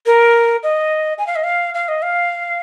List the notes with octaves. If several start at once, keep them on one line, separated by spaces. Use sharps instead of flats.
A#4
D#5
G#5
F5
D#5
F5
F5
D#5
F5